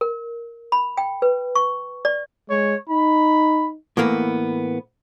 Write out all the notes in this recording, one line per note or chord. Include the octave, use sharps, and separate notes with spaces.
A#4
B5
G5
B4
C#6
D5
G#3 C#5
D#4 B5
A2 E3 A#3 B3